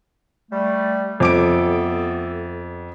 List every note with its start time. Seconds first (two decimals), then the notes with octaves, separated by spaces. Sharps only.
0.51 G3 A3
1.20 F2 A3 B3 A4 D6 D7